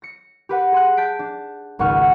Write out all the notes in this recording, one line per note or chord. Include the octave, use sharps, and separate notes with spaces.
A#6 C#7
G4 B4 F#5
G#4 C6 F#6
A5 G6 B6 D7
D4
G#1 C#2 F#5 C#6 E6 F6